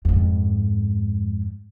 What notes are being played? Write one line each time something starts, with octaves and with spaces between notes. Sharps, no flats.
F2 G#2